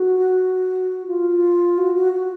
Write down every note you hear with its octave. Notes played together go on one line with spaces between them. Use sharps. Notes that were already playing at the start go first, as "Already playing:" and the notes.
Already playing: F#4
F4
F#4
F#4
F#4